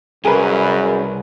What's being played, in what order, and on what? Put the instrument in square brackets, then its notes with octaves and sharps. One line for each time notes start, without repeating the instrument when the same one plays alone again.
[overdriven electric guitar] C2 [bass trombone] F#2 [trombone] C#3 [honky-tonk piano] G#4 A#4 B4